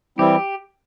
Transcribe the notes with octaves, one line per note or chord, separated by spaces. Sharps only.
E3 G3 C4 E4 G4